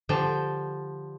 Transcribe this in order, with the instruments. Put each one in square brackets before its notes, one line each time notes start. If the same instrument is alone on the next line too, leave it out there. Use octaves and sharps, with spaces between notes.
[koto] D3 F3 G3 G5 A5